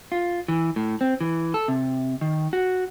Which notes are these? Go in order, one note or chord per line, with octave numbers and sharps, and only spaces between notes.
F4
E3
A2
C4
E3
A4
C3
D#3
F#4